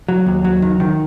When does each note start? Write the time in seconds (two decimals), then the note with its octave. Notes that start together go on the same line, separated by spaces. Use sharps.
0.08 F#3
0.26 D#2
0.44 F#3
0.62 D#3
0.80 D#3